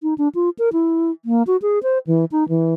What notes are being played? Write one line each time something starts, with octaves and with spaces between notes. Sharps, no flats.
D#4
D4
F4
A#4
E4
A#3
F#4
G#4
C5
E3
D#4
E3